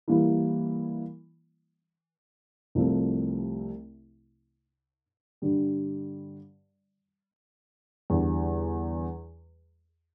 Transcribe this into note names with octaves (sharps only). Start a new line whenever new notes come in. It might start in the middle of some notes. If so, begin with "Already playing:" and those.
E3 G3 A#3 E4
C2 C3 F3 A3 C4
G2 D3 G3
E2 D3 G3